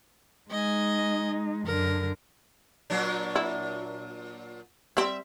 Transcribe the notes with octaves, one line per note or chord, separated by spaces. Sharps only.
G#3 D#4 D#5 G#5
F#2 D3 A#4
A#2 F#3 D4
E4
G3 C4 E5